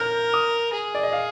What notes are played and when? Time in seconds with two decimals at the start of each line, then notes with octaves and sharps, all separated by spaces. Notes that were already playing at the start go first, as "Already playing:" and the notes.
Already playing: A#4 F6 G6
0.34 D#6
0.73 G#4
0.95 D5
1.03 D#5
1.13 F5